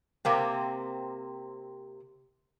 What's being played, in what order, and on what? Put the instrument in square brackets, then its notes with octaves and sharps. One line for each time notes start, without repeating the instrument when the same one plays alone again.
[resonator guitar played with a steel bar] C3 A#3 C4